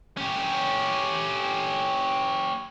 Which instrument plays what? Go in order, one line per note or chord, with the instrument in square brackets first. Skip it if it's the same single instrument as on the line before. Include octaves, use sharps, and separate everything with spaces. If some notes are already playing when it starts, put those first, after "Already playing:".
[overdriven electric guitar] C#4 G4